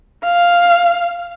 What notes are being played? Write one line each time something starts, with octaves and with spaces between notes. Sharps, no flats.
F5